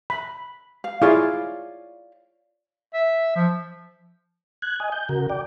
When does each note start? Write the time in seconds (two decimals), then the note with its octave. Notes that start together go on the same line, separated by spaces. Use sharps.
0.10 B5
0.84 F5
1.02 E4 F4 G#4 C#5 D5 F5
2.94 E5
3.36 F3
4.62 F#6 G#6
4.80 D#5 G#5
4.92 G6
5.09 C#3 F#4 A#4
5.29 D5 G5